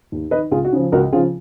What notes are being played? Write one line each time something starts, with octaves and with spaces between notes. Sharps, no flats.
D#2
D#3 B4 D#5
C#2 F4 G#4
F#4
C#3 F3
C#2 F#4 A#4
C#3 F3 F4 G#4